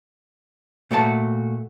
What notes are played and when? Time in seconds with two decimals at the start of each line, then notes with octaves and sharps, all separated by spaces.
0.91 A#2 A3 F#4 C#5 A5